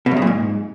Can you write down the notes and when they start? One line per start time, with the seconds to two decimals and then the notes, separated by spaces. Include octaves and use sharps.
0.06 B2
0.11 F#2
0.17 C#3
0.22 A#2
0.27 G#2